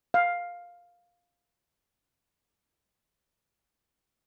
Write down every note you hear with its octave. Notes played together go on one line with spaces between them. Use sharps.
F5